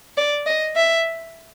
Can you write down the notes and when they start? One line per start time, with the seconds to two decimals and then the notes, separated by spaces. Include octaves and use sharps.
0.17 D5
0.46 D#5
0.76 E5